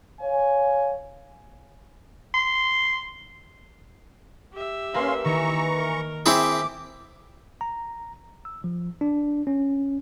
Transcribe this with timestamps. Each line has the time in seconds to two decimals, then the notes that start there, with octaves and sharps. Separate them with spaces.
0.20 C#5 F5 G#5
2.34 C6
4.53 G4 E5
4.94 A#3 C#4 A#4 B4 F5 C6
5.25 D#3 E3 A#5 C#6
5.77 A#4
6.26 C4 E4 G#4 E5 D6
7.61 A#5
8.45 E6
8.64 F3
9.01 D4
9.47 C#4